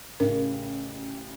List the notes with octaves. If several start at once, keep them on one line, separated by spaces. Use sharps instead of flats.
A1 C#3 A#4